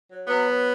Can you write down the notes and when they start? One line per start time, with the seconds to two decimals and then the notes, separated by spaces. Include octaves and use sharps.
0.08 F#3
0.28 F#3 B3
0.46 F#3